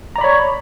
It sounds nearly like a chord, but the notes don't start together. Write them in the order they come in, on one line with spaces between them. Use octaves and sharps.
A#5 D5 B5 C#5